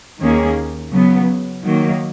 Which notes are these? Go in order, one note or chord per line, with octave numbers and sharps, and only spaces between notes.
D#2 D#3 A#3 C#4 G#4
C#3 F#3 B3
D#3 F#3 A#3